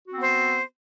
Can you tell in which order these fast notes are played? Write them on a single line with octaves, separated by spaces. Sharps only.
F#4 C4 B3 C5